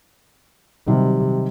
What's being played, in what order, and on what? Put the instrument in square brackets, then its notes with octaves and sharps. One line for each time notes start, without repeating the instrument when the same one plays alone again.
[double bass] C3 [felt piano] D#3 F#3 G3